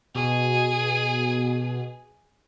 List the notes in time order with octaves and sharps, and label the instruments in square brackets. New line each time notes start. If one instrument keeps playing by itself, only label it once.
[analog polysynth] B2 [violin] G#4